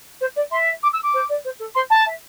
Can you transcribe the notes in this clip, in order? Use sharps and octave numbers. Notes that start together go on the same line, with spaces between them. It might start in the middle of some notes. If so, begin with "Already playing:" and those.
C5
D5
E5 C6
D6
E6
D6
C5
D5
C5
A4
C5 C6
A5
E5